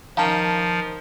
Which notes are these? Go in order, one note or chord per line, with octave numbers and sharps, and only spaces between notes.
D#3 F3 C#4 F5 A5